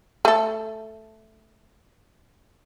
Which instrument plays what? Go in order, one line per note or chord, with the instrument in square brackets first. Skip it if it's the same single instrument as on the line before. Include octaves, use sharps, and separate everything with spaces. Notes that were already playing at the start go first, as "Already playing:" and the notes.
[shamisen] A3 A4